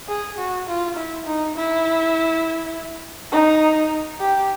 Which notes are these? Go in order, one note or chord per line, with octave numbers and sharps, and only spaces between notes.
G#4
F#4
F4
E4
D#4
E4
D#4
G4